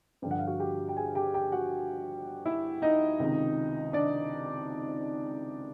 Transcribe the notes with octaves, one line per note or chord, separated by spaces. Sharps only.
G2 D3 F3 G5
F#5
F5
F#4 F#5
G4 G5
G5
G#4 G#5
G4 G5
G4 G5
F#4 F#5
E4 E5
D#4 D#5
C#2 C3 D#3
D4 D5